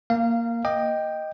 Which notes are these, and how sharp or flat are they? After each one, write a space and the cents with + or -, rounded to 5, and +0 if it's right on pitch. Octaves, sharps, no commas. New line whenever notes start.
A#3 +0 F5 -20
D#5 +0 G5 +0 D6 +25